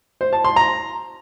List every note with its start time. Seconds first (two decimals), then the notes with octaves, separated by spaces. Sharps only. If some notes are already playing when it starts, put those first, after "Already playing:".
0.21 C5
0.33 A5
0.44 C6
0.56 A#5